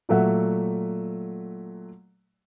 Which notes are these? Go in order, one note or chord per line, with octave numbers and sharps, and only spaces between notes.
A#2 F#3 A3 E5 F#5